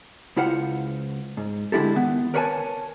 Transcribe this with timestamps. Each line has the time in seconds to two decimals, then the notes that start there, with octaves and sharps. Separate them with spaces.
0.37 C#2 E4 F4 C5 F#5
1.37 G#2
1.72 D3 G#3 D4 E4 G4 A4
1.95 D#3 B3
2.34 A#4 B4 C#5 E5 G#5 A5